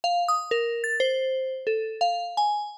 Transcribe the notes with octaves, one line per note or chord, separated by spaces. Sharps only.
F5
D#6
A#4
A6
C5
A4
F5
G#5